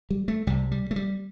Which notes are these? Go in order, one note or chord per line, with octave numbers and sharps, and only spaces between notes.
G3
A3
C2 C3 G3
G3
A3
G3